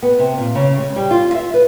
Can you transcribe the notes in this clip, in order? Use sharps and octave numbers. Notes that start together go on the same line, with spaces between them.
B3
C3
A#2
C#3
G#3
G3
F4
E5
B4